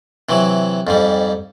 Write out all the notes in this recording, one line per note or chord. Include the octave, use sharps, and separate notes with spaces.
C3 E3 F#3
F2 G#2 G3